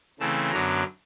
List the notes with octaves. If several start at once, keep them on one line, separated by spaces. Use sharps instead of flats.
C#3 E3 A3 C4 A5
F#2 D3 F#3 B3 D4 A#5